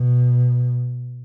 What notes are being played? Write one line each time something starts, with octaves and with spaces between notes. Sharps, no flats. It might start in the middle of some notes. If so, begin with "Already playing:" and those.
Already playing: B2